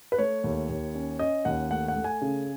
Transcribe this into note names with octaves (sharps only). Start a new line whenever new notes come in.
B4
A3 C#5
D#2
D#2
C#4
C#4 D#5
D#2 F#5
A3 F#5
F#5
A3
G#5
C#3